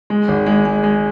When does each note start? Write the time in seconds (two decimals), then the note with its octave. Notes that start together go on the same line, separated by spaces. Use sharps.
0.10 G#3
0.28 G#1
0.46 G#3
0.65 G#3
0.84 G#3